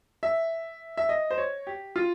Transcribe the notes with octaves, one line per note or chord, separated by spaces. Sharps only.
E5
E5
D#5
C5
C#5
G4
F4